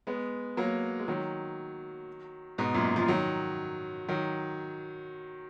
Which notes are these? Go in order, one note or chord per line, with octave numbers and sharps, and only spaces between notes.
G#3 B3
F#3 A#3
G#3
D#3 F#3
G#2 B2
F#2 A#2
F3
D#3 F#3
D#3 F#3